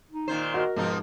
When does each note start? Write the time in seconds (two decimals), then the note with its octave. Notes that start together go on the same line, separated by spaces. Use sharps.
0.11 D#4
0.28 A#2 D#3 C5
0.54 F#4 A#4 D#5
0.76 G#2 B2 F3 D#4